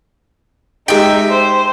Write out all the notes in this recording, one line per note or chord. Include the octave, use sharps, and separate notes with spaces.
G#3 D#4 G4 E5 G5
C5